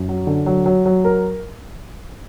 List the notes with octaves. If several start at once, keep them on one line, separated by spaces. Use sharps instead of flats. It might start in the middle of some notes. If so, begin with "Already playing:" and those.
Already playing: F#2
F#3
D3
F#3
F#3
F#3
A#4